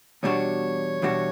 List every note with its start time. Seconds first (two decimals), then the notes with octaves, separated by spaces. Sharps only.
0.23 E2 B2 G3 D4 F#4 C#5
1.02 E2 B2 G3 D4 F#4